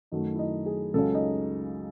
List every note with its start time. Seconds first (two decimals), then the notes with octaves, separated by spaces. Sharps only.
0.12 F#2 D#3 F#3 A3 D#4
0.35 E4
0.39 D#4
0.66 G#4
0.94 C#2 C#3 F#3 C#4 A4
1.14 D#4